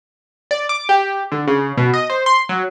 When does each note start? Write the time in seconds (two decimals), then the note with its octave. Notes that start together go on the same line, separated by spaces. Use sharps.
0.51 D5
0.69 D6
0.89 G4
1.32 D3
1.48 C#3
1.77 B2
1.94 D#5
2.10 C5
2.26 C6
2.49 F#3